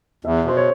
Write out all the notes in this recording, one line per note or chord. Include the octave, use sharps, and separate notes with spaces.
E2 E5
B2 C5
C#5